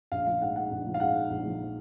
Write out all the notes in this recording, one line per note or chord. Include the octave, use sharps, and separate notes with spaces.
A#1 F5
F3 F5
G#2 F#5
G#3 F#5
A#1
F3
F5
G#2 F#5
G#3
A#1
F3